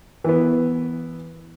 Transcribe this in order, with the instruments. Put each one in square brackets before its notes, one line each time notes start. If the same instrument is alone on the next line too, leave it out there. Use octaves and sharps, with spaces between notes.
[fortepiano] E3 B3